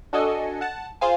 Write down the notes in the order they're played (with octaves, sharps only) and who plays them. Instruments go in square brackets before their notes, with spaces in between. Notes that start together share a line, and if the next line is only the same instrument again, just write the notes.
[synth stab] D4 F#4 A4 D#5 G#5 C#7
F#5 A5
F4 G#4 C5 F5 G#5